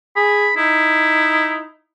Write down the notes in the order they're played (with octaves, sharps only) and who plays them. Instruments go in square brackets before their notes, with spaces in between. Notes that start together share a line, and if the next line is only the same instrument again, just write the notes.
[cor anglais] G#4 [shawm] B5
[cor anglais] D#4 [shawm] E4